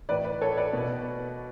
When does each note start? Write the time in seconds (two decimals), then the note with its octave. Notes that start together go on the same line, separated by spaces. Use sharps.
0.09 A2 E3 B4 D5
0.24 B4 D5
0.41 A4 C#5
0.57 B4 D5
0.73 B2